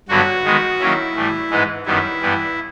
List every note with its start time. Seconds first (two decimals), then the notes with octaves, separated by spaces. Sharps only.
0.09 G2 D3 F#3 B3 F#4
0.44 D#3 G#3 B3
0.80 D#3 F#3 A#3 C#4 E4
1.15 A2 E3 G3
1.50 G#2 E3 G#3 B3 D#4
1.86 F#2 D#3 G3 B3 E4
2.22 G2 E3 G3 B3